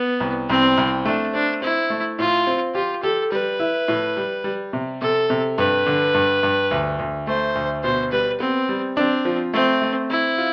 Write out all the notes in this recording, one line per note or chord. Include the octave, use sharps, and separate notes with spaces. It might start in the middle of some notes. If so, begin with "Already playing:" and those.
Already playing: B3
C2
C2 C4
C2
A3 D4
C4 D4
C4 E4
A3
A2 F4
C4
F4 G4
G4 A4
G3 B4
E4
A2
G3
G3
C3
C3 A4
C3
G2 B4
D3
G2
G2
D2
D2
A3 C5
D2
B2 C5
G3 B4
B3 C4
G3
C4 D4
F3
A3 C4
A3
C4 E4
F4